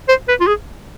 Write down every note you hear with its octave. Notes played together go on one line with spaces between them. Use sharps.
C5
B4
F4
G#4